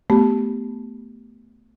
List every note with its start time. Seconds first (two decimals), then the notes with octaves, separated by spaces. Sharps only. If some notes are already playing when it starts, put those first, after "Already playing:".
0.10 A3 B3 G4